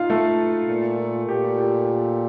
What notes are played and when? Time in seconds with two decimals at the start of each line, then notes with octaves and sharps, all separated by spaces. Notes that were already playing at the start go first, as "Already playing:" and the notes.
Already playing: D#4 F4 F5
0.10 A3 A4
0.69 A#2
1.28 A#2 G4
1.58 G4